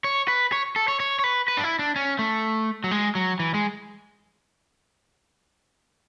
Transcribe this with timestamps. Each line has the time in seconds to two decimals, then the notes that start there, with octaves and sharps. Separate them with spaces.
0.04 C#5
0.28 B4
0.52 C#5
0.76 A4
0.88 C#5
1.00 C#5
1.19 C#5
1.24 B4
1.48 B4
1.57 D4
1.64 E4
1.79 D4
1.96 C#4
2.19 A3
2.84 F#3
2.91 G#3
3.15 F#3
3.39 E3
3.54 G#3